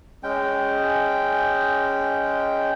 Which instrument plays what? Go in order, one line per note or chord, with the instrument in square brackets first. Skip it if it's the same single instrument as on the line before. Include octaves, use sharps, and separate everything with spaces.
[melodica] G#3 C#4 G5